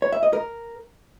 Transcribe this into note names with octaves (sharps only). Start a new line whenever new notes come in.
C#5
E5
D#5
A#4